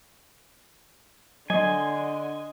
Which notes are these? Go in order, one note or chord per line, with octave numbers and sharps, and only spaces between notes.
D3 F#3 D#5 G#5 C6